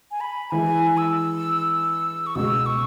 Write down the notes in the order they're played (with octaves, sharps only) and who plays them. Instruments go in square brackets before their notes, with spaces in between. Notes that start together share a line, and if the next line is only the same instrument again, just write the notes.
[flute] G#5
B5
[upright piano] E3 G#3 E4 G#4 [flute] G#5
[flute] E6
C#6
[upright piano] C#2 B2 G#3 [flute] E6
[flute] C#6